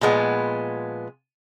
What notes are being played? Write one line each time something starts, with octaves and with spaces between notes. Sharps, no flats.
A#2 F3 G#3 B3